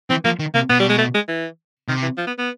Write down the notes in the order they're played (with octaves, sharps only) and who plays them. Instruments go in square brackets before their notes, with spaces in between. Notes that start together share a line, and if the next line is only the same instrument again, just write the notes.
[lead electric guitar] E3 [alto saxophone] C4
[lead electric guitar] F3 [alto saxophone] A#3
[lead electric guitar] D#3
[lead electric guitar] C3 [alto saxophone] A#3
[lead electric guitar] B2 [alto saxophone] B3
[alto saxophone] G3
G#3
A3
G#3
E3
[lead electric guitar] C3 [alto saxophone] D#3
[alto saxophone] E3
F3
B3
B3